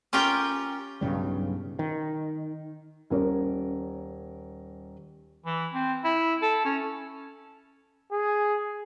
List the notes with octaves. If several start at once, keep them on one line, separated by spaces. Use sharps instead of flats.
C#4 F4 G4 A#4 G5
B1 G2 C#3 G3
D#3
D#1 C#4 A#4 C#5
E3
C4
E4
A4
C#4
G#4